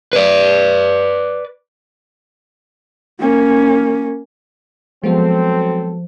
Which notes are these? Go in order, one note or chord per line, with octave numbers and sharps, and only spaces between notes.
B4 D5
A#3 C#4
F3 F#3 G#3 B3 C4 F#4 A4 C5